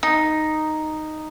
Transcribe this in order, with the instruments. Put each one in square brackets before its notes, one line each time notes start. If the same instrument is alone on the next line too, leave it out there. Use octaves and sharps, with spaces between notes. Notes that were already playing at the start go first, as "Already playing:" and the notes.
[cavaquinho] D#4